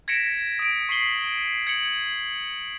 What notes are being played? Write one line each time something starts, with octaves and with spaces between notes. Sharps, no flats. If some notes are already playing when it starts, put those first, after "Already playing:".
G#6 A#6 B6 C#7 D7 E7
D#6 D7
C#6 B6 C7 F#7 G7
G#6 C#7 F#7